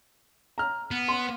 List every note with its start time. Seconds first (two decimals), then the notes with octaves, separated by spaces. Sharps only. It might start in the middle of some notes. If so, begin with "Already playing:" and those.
0.58 A#5 F6
0.91 B3
1.08 C6